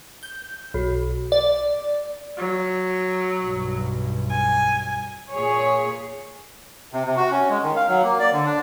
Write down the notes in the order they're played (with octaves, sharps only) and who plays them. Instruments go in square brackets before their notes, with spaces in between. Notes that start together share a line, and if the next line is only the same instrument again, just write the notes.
[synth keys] G6
B1
D5
[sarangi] F#3
[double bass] B1 G2
[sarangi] G#5
[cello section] A#2 G#4 C#5
[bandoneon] C3
C3
F#4
C#4
G#3
D#3
F5
F#3
A#3
D5
D3
D4